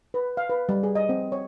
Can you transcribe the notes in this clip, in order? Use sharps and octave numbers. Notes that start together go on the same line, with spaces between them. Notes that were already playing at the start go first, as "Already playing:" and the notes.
B4
F5
B4
G3
G#4
D#5
C4
C#5